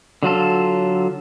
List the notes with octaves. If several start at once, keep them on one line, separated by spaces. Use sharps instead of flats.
D3 F#3 F4 A4